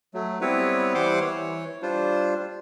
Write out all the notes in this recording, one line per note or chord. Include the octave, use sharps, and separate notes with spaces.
F#3 A3
G3 B3 C4 E4 B4 C#5
E3 G3 C5 F#5 C6 D6
E3 C#5
G3 D4 F4 C5